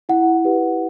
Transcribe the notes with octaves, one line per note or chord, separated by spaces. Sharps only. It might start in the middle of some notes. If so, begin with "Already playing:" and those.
E4 F#5
G4 B4